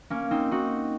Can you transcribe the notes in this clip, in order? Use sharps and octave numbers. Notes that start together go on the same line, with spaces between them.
A#3 C#4
C4 D#4
D#4 F#4